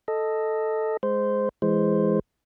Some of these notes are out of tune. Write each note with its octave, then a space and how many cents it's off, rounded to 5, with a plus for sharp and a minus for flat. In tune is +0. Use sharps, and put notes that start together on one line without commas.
A4 +0 D#5 +0
G#3 +0 C5 -10
E3 +15 G#3 +0 C5 +0